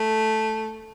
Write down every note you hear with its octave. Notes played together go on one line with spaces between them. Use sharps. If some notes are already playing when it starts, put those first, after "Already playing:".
Already playing: A3